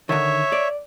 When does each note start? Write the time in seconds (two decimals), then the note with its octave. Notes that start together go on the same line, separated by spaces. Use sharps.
0.09 D3 D#3 C#5 E5
0.52 D5